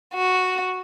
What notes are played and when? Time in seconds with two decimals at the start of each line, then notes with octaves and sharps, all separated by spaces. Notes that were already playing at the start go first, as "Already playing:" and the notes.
0.14 F#4